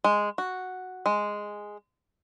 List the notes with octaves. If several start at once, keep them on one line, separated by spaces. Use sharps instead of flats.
G#3
F#4
G#3